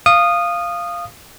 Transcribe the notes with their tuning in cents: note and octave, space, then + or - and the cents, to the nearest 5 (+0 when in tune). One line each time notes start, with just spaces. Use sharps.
F5 -10 D#6 -15